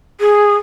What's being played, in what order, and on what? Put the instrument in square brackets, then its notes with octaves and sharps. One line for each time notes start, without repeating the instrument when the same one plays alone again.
[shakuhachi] G#4